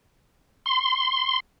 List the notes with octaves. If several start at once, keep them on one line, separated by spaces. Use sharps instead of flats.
C6